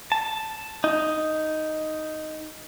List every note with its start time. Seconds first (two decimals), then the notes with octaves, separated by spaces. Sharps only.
0.12 A5
0.84 D#4